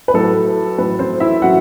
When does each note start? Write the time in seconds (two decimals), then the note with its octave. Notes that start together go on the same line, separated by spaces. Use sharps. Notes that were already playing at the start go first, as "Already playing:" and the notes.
0.08 B4
0.14 A2 F#3 A3 A4
0.78 A2 F#3 A3 B4
0.99 C4 C5
1.20 E4 E5
1.42 A2 F#3 F#4 F#5